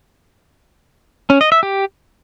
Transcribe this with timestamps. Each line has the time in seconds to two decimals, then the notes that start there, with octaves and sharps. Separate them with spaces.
1.30 C#4
1.41 D#5
1.52 E5
1.63 G4